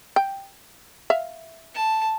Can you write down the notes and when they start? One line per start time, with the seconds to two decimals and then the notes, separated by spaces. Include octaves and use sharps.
0.16 G5
1.10 E5 F5
1.75 A5